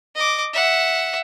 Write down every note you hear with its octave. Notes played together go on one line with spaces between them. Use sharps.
D#5 D6
E5 F#5